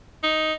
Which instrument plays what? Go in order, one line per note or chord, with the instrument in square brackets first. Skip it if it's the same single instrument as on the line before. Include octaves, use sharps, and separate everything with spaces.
[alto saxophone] D#4